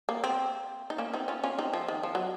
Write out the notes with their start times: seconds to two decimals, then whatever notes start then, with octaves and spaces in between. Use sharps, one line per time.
0.09 A#3
0.24 C4
0.90 D#4
0.98 A#3 C#4
1.13 C4 D#4
1.28 C#4 F4
1.44 C#4 F4
1.59 C4 D#4
1.73 F3
1.88 D#3
2.03 F3
2.15 F#3